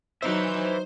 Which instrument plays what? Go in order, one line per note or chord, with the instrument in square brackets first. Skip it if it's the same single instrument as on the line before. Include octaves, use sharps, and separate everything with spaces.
[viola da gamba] F#3 D#4 [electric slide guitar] B4 E5 [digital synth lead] C5